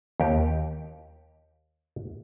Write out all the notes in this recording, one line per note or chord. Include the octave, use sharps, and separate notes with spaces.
D#2 G4